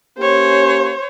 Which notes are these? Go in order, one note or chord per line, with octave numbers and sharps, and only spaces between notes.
A#3 C#4 G4 C5 C#5